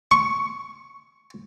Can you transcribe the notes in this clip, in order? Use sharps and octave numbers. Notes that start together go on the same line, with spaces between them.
C#6